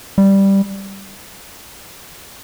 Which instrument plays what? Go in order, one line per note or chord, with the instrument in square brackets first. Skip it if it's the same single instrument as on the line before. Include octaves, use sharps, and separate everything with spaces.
[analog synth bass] G3